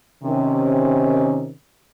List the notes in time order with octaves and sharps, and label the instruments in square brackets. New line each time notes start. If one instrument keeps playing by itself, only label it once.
[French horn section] C3 D#3 C#4